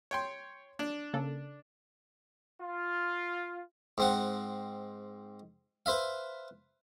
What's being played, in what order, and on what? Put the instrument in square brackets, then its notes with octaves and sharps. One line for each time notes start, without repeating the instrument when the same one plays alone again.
[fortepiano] C#5 G5 C6
D4
[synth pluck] C#3 A#3 A4
[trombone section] F4
[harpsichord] G#2 C4 F#5
B4 C5 E5 F5